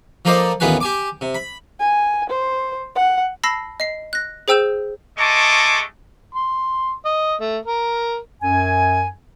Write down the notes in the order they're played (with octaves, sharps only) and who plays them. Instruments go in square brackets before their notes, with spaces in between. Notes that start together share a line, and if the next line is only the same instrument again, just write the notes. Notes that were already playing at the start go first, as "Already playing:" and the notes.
[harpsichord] F3 A#3 A4 C5 D5 D#5
A1 D#2 B3 F4 B4 G#5
G4 G#5 D6
C3
B5
[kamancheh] G#5
C5
F#5
[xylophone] A5 B5 E6 A#6 C7
D#5 C7
F#6 A#6
G#4 C5 G5 E6 G6 E7
[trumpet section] G#3 A3 D#5 A5 C#6 D6
[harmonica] C6
D#5
A3
A#4
[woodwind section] F#2 G#5